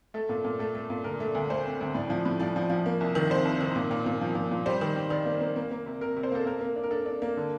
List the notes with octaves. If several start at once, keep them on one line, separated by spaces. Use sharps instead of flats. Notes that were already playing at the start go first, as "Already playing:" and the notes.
A3 A4
A#2
A#2
A3 A4
A3
A#2
D3 A#4
A3
D2
A3 C5
C4
D2
A2 D5
F3
A2
F3 D5
F3
F3
A#3
C2
D#3
C3 C5
C2
D#3
A#2
A#2
A#2
F3
A#2
A#2
G3 C5
D#3
G3
D#3 D5
A#3
A#3
A#3
A#3
C3
C3 A#4
C3
C5
A#3 A4
A#3 A#4
A#3
D4
A#4
D4 A4
D4
A#3
D3